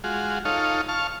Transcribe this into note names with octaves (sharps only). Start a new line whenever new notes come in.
G#3 F4 F#4
D#4 F4 A4 C#5 F5
F5 A5 C#6 F6